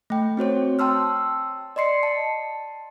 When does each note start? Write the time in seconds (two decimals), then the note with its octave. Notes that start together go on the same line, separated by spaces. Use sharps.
0.10 A3 G5
0.37 C4 F#4 C5 C#5
0.79 G5 A5 C6 E6 F6
1.76 D5 D#5 C6 C7 C#7
2.03 A5